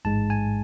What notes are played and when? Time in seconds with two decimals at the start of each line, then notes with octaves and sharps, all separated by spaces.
0.05 A1 G#2 G#3 A5
0.30 G#5